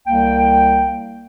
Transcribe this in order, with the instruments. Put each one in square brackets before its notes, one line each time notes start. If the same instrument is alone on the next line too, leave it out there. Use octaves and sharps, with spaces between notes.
[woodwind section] C2 A#3 G5